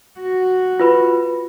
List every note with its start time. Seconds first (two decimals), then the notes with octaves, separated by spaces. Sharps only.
0.20 F#4
0.80 F4 B4 B5